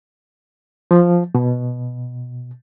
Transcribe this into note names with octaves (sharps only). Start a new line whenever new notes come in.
F3
B2